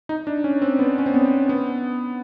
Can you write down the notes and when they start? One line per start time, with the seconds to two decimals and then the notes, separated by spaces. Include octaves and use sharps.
0.09 D#4
0.27 D4
0.44 C#4
0.62 C4
0.79 B3
0.99 C#4
1.06 C4
1.14 B3
1.49 B3